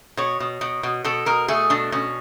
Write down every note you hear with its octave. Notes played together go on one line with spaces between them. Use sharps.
B2 C#5
B2
B2
B2
B2 A4
B2 A#4
A3 G#4
B2 D4
B2 C#4